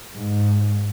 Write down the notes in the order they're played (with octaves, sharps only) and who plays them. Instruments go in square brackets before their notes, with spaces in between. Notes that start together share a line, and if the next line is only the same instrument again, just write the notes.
[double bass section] G#2